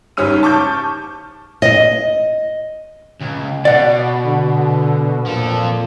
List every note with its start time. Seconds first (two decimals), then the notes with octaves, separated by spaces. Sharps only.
0.17 F#1 G#2 G3 C#4 F6 D#7
0.43 A5 C#6 D6 G6
1.62 D#5
3.21 C#2
3.65 B2 D5 F#5
4.25 D3
5.26 A#2 F3 A4